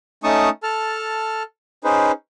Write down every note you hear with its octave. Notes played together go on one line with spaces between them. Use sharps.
A3 C#4 D#4 A5 C#6 D#6
A4 A5 F6
C#4 D#4 G#4 B4 C5